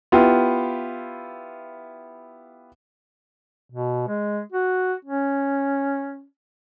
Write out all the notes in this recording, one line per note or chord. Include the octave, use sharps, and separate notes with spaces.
B3 E4 F4 G4
B2
G#3
F#4
C#4